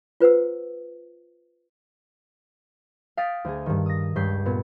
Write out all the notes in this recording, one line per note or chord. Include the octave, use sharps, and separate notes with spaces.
F4 B4 C5 F#5 E6
F5 G5 D#6 A6 B6 D7
D2 G#4
G2 D#3
D#6 A#6
C#2 G2 G6 B6 C7
A#2 B3